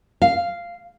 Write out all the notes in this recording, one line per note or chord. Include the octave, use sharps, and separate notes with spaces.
F5